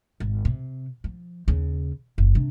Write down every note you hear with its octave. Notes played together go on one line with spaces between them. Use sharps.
G#1
C3
F3
D#2 C#3
F#1
C3 D4